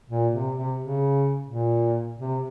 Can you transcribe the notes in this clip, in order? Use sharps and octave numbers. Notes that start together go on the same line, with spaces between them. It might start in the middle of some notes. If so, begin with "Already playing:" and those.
A#2
C3
C3
C#3
A#2
C3